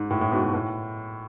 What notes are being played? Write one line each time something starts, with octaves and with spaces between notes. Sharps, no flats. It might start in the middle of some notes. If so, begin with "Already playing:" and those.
Already playing: G#2
A2
A2
G#2 B2
A2
A2